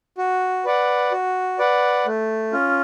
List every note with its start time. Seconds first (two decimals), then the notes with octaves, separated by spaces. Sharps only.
0.18 F#4
0.65 B4 D5 F#5
1.12 F#4
1.59 B4 D5 F#5
2.06 A3
2.53 C#4 F4